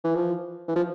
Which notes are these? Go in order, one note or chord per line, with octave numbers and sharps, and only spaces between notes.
E3
F3
E3
F3